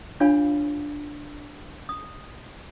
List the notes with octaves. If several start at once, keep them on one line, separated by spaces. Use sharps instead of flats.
D4 F4 C#5 F5 G#5 B5
D#6